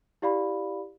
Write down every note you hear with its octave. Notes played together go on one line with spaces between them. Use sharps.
E4 G4 D5 F5 B5